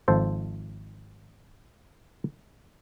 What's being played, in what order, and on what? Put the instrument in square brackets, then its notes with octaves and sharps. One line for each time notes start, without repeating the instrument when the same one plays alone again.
[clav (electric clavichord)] G#1 F3 A4 C5